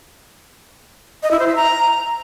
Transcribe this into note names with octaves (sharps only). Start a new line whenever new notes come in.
D#5
E4
C5
E5
A#5